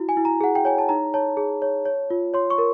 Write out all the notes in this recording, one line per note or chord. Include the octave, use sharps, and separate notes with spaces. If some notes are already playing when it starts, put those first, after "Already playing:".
Already playing: E4 F#4
G#5
E4
A#5
G#4 F#5
G5
C#5 G#5
A5
D#4 A#5
C#5 A5
G#4
C#5
C#5
F4
C#5 C6
C#6
A#4